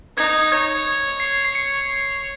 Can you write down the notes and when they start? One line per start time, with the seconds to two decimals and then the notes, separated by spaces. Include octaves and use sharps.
0.18 D#4 G#6
0.52 C#5 G#6
1.20 C7
1.45 C7
1.55 C#7